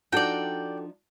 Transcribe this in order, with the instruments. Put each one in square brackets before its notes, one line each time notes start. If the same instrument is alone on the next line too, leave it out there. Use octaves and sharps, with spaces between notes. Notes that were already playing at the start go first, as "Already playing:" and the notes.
[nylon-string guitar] F3 D4 D#4 [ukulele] F#4 A4 [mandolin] D5 G5